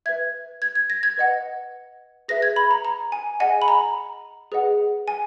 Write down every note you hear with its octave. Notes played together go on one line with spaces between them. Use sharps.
B4 E5 G#6
G#6
G#6
A#6
G#6
B4 D#5 F#5
G#4 B4 E5 A#6
G#6
B5
A#5
A#5
G#5
G#4 D#5 F#5 G#5
B5
A#5
G#4 B4 D#5 F#5
G#5